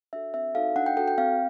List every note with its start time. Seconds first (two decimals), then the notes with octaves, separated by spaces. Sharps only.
0.13 D4 F#4 A4 E5
0.34 C4 E5
0.55 D#4 F#4 A4 F5
0.76 D4 F#5
0.86 G5
0.97 F#4 A4 G5
1.08 G5
1.18 C4 F5